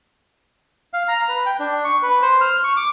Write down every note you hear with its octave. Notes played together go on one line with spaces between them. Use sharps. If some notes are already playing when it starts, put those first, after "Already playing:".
F5
A#5
B4
G5
D4
C#6
B4
C5
F6
C#6
D6